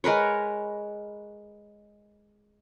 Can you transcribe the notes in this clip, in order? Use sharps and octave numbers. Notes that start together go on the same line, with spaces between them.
G#3 A#4 B4 C#5